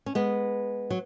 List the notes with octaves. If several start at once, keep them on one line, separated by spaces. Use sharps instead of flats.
C#4
G#3 B3
F#3